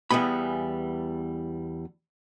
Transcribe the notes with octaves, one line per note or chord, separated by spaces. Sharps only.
E2 E3 G3 B3 B5